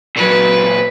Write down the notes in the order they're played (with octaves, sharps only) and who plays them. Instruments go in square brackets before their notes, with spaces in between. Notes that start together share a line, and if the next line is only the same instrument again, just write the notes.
[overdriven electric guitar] A#2 F#3 [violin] B4